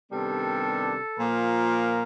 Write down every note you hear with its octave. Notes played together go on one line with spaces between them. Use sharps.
C3 D#3 G3 B3 D4 A4
A#2 F3 A#3 A#4